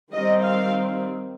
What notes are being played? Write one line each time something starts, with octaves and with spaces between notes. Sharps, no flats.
D#3 G3 C4 D#5
F5